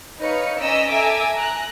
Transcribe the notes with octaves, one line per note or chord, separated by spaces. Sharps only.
D#4 B4 C#5 F5 C#7
C#4 D5 D#5 A#5 E6 B6
A4 E5 G#5 A#5 D6 E6
A#5 F#6